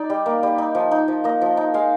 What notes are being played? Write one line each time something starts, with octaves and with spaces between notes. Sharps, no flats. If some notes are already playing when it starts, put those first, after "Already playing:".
Already playing: D#4 D5
G3
A#3
G3
D#4
F3
D#4
F3
A#3 D#5
F3
D#4
G#3 F5